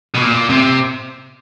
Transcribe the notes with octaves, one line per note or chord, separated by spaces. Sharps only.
B2
A#2
C3